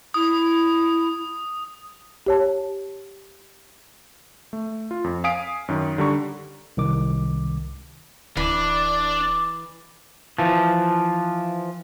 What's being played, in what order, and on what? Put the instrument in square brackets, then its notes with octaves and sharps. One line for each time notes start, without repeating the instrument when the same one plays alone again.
[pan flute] E4 [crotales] D#6
[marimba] G4 C#5 A5
[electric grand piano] A3
F4
F2
F5 G#5 D#6 B6 D7
F#2 D#3
D3 G3 A#5 C#6
[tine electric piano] C2 D#3 D6
[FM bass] D1 [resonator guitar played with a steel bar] E3 [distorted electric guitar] D4 [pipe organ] D6
[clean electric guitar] E3 F3